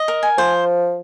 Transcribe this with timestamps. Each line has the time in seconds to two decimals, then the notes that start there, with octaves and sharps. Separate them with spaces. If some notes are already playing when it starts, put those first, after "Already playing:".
Already playing: D#5
0.08 A#4
0.23 G#5
0.38 F3 C5